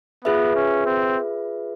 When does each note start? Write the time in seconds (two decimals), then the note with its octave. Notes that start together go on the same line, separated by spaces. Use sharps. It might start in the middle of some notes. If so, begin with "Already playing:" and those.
0.25 B3 F4 G#4 B4 E5
0.55 C#4
0.86 C4